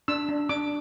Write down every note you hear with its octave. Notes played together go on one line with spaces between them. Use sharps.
D4 E6
D4
D4 D6